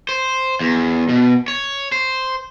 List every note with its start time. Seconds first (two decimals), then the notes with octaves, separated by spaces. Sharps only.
0.09 C5
0.61 E2
1.09 B2
1.48 C#5
1.92 C5